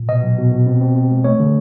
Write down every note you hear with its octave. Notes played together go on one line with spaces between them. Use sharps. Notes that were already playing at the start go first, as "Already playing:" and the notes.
Already playing: A#2
B2 D#5
F#3
B2
B2
C4
C4
C4
G#3
A3 C#5
D3